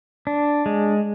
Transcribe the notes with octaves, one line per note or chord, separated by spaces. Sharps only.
D4
G#3